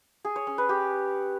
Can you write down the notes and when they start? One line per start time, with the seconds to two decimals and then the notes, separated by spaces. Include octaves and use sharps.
0.25 G#4
0.36 C#5
0.47 C#4
0.58 B4
0.69 G4